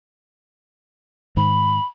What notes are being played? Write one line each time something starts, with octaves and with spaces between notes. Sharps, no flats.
G#2 D#3 B5